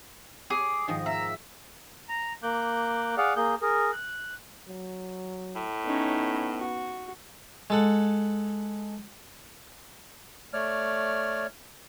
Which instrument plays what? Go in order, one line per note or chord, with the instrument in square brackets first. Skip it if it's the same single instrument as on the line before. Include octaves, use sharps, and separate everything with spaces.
[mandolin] G#4 [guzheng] C#5 [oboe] D6
[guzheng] G#2 D#3 F3 [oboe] D#5
[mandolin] E5 [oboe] A#5
[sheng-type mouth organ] A#5
A#3 D6 F#6 G6
G#4 D5 F5 F#5
A#3 G#4 G6
G#4 A#4
F#6
[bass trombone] F#3
[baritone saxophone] A2
[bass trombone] B3 [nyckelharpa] C#4 D#4
[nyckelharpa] F#4
[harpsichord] G#3 A4 F#5
[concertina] A3 C#5 D5 F6